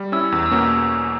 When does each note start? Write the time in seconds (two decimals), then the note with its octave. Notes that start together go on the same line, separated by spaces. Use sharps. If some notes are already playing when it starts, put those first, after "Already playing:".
Already playing: G3
0.12 C#4 E4 E6
0.32 E2
0.46 E6
0.51 B2 A#3 C#4